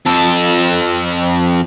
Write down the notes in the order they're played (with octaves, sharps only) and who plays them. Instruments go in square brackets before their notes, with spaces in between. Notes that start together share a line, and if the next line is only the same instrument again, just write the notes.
[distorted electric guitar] F2 A4